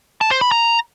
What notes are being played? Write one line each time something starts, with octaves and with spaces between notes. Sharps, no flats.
A5
C5
B5
A#5